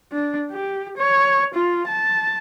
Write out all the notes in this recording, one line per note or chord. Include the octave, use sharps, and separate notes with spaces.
D4
G4
C#5
F4
A5